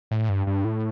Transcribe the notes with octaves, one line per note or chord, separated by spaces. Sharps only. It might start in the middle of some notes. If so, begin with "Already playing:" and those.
A2
G2
G2
A2